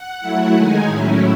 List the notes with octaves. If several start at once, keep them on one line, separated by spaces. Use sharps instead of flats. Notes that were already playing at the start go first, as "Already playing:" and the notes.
Already playing: F#5
F#3 A3 E4
D#3 G#3 D#4 G#5
A2 F#3 C#4 E4